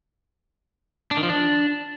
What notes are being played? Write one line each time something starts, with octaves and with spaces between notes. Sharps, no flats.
D4
D#3
F3
D4